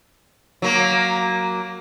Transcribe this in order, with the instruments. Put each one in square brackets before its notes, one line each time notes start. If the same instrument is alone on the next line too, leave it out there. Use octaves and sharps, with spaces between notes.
[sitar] F#3 A#3